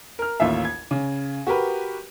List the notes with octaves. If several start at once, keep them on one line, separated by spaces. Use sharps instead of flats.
A#4 F6
A1 D#2 F4 E5
G#6
C#3
F#4 G4 A#4 B4